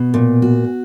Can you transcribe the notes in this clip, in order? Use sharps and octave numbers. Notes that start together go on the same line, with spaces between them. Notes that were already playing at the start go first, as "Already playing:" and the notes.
Already playing: B2
A#2
F#4